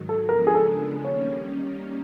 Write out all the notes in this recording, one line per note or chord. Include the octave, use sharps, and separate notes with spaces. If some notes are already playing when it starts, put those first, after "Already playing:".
Already playing: G#2 D#3 F#3
A4
C#3 F3 G#3 B3 D4 A#4
G#4
A4
D#3 G3 A#3 C#4 C#5